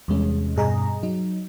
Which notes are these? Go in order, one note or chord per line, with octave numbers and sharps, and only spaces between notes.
E2 C3 G3 G#3 C#4
G2 B2 G3 G#4 D#5 A#5
F#3 D#4